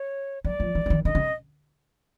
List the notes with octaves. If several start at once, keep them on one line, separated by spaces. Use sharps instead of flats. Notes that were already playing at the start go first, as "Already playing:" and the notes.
Already playing: C#5
F#3 D5
F3
E3
E3
D#3
D3 D#5
C#3